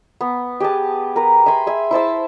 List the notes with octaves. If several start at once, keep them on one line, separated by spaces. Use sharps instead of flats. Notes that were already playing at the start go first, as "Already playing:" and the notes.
B3
G4 G#4 B4 A5
A#4 B4
E5 G#5 B5 C6
G#4 E5 G#5
E4 C5 A5 E6